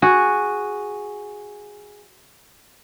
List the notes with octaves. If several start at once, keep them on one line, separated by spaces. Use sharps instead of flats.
F#4 G#4